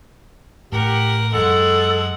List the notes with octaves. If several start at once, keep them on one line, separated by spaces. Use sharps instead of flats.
A1 A2 G4 A#4 F#5
F#2 E3 G#3 A4 F#5